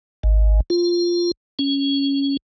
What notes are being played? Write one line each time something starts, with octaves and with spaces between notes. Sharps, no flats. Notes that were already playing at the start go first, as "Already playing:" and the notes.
G#1
F4
C#4